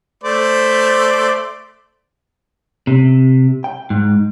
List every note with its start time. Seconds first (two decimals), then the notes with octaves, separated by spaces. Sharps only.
0.24 A3 C5 D5
2.87 C3
3.64 G5
3.90 G#2